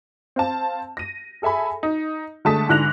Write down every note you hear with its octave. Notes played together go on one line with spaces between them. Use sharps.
C4 F5 A5
A#6 D#7
G#4 A4 E5 G#5 B5
D#4
D3 G#3 A3 A5 D#6 B6
G#2 D3 E4 F#6 A#6 F7